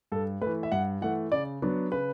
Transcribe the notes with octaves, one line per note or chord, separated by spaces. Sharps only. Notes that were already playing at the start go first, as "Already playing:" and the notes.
G2 A4
A3 B4
E3
E5
G2 F#5
E3 A3 F#5
C#3 D5
F#3 B3 D4
C#3 B4